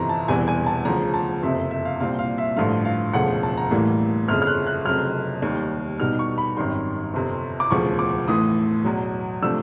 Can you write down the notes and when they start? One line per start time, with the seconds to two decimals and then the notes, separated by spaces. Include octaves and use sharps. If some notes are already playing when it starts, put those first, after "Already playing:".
Already playing: G1 F2 C3 E3 A#5
0.09 A5
0.28 E1 E2 C3 E3 G3 G#5
0.48 G#5
0.66 A5
0.85 D2 C#3 F3 A#5
1.14 A5
1.43 F#1 F2 C3 E5
1.71 E5
1.85 F5
2.00 C2 A#2 G3 C4 F5
2.19 F5
2.38 E5
2.56 A1 G2 D3 F3 A3 F5
2.85 F5
3.13 E1 D2 C#3 F3 A3 F#5
3.43 A5
3.57 A#5
3.71 A1 A2 E3 G3 A#3
4.28 G1 F2 C#3 F6
4.42 F6
4.47 F#6
4.67 F#6
4.85 F1 F2 C#3 F#3 F6
5.42 D#2 D#3 G3
6.00 B1 B2 G3 B3 D#4 F6
6.19 C#6
6.38 B5
6.56 G#1 F#2 D#3 G3 C6
7.14 G1 F2 C3
7.60 D6
7.71 E1 D2 C#3 F3 C#6
7.99 D6
8.28 A1 A2 E3 D#6
8.84 E2 B2 F#3
9.42 C3 F3 A3 D4 E6